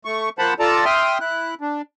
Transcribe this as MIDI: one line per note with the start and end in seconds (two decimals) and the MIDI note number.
0.05 0.29 57
0.05 0.29 85
0.39 0.54 53
0.39 0.54 58
0.39 0.54 72
0.39 0.54 78
0.39 0.54 81
0.39 0.54 83
0.60 0.85 65
0.60 0.85 69
0.60 0.85 74
0.60 0.85 81
0.60 0.85 82
0.85 1.18 76
0.85 1.18 79
0.85 1.18 84
0.85 1.18 87
0.85 1.18 89
1.20 1.54 64
1.20 1.54 90
1.61 1.82 62